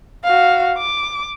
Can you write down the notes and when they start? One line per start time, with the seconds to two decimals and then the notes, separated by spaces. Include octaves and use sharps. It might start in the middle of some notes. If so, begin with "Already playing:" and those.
0.24 F#4 F5
0.78 D6